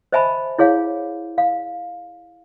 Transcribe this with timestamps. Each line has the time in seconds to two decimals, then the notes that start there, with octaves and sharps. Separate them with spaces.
0.12 C5 D#5 E5 G#5 A5 B5
0.58 E4 G#4 C#5 F5
1.38 F5